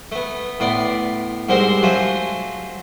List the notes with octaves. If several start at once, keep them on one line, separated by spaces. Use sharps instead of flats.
A3 B3
A2 B3 D5 C6
G#2 F#3 G3 C4 A#4 C6
F#3 A3 C#4 F4 C5